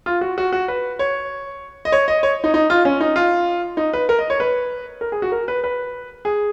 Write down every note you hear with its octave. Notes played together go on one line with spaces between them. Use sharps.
F4
F#4
F#4
F#4
B4
C#5
D#5
C#5
D#5
C#5
D#4
D#4
F4
C#4
D#4
F4
D#4
B4
A#4
D#5
C#5
B4
A#4
G#4
F#4
A#4
B4
B4
G#4